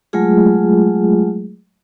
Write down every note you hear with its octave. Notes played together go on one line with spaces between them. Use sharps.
F#3 G#3 A3 F4 G#4